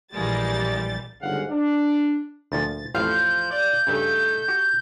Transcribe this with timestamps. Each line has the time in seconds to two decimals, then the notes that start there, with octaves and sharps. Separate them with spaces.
0.14 A#1 E3 G3 G#3 A#3 A6
1.22 G1 G#2 C#3 F5 F#5
1.50 D4
2.52 D2 A#2 F3 A6
2.95 A1 F2 A2 F3 F5 G6
3.51 D5
3.87 G2 C#3 A3 D#4 A4
4.48 F#4 G4